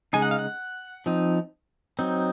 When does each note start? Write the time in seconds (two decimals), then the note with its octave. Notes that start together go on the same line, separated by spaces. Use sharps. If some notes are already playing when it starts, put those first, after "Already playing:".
0.13 C#3 G#3 D#4 G#5
0.22 F#5
0.31 F5
0.39 F#5
1.06 F3 C4 D#4
1.99 F#3 C4 D#4